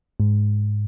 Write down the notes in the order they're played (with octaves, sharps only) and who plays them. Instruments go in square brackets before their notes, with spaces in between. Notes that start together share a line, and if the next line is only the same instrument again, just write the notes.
[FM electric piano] G#2